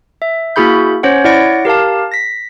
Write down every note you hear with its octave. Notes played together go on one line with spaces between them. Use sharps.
E5
A#3 E4 F#4 G#4 B5 G6
C#4 C5 C#5 F#5
E4 C#5 D5 F#5 A#6 D7
G4 A#4 F5 A5
A#6 B6